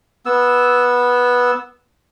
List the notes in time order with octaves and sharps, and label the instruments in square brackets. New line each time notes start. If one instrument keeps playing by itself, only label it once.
[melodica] B3 E6